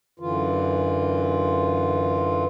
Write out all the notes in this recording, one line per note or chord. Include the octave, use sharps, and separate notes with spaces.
F#2 D3 E3 F4